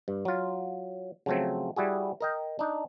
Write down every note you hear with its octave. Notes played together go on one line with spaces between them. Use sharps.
G2
F#3 F4
C#3 F3 F#3 A3 C4
G3 E4 F#4 G#4
A#4 D#5 G5
D4 D#4